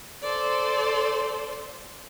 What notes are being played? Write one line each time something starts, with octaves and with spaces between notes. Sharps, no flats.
A4 C5 D5